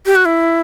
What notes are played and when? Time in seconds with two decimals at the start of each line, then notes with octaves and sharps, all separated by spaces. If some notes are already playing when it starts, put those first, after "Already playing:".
0.06 G4
0.16 F#4
0.25 E4